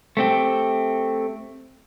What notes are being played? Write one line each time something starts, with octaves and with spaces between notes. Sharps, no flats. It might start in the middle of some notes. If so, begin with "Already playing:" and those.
A3 C4 G4